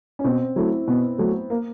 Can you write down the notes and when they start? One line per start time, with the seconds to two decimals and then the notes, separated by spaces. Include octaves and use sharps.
0.19 C#4
0.24 B2 C4
0.56 F#3 A3 E4
0.87 B2 B3
1.19 F#3 A3
1.50 A#3